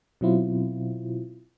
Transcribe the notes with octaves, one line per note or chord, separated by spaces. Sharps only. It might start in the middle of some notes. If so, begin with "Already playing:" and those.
B2 F#3 C4 E4 F4